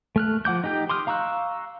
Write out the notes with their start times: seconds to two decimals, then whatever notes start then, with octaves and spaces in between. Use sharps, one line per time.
0.16 A3 F6 F#6
0.45 F3 F#5 D6 G6
0.64 D#4 G4 G6
0.90 C6 D6 D#6 F6
1.07 F5 A#5 C#6 E6 F#6